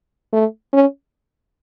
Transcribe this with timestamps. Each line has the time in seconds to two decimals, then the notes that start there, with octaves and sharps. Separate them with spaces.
0.33 A3
0.73 C#4